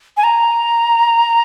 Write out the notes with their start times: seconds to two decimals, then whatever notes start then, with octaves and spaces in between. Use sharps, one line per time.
0.17 G#5
0.24 A#5